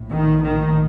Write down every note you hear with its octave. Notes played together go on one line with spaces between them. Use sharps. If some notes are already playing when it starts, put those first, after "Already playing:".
Already playing: A#1 A2
D#3
D#3